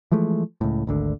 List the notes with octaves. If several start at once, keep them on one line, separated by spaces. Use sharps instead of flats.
E3 F3 G#3 A3
C#2 A2
G#1 D2 D3